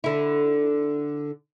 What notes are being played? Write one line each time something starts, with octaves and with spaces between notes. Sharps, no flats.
D3 E4